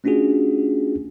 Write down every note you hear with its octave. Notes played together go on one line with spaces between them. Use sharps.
A3 C#4 D4 F4 F#4 G#4